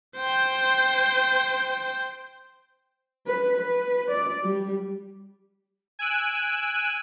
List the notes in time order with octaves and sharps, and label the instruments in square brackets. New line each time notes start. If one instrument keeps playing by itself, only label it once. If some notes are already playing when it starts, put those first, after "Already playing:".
[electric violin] C5 G5
[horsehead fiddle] B4
B4
D5
G3
[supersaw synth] G#5 E6 F#6 D7 D#7